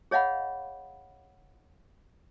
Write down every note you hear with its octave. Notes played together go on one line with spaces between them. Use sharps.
G#4 C#5 D#5 F5 F#5 B5